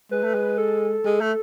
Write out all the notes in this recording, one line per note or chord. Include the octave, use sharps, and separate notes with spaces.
G#3 B4
A3
G#3
A4
G#3
A3